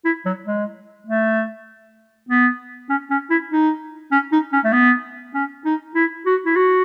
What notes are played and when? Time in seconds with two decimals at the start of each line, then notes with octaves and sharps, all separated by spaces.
0.05 E4
0.26 F#3
0.46 G#3
1.07 A3
2.29 B3
2.90 C#4
3.11 C#4
3.30 E4
3.51 D#4
4.12 C#4
4.32 D#4
4.53 C#4
4.64 A3
4.73 B3
5.34 C#4
5.65 D#4
5.95 E4
6.26 F#4
6.46 E4
6.56 F#4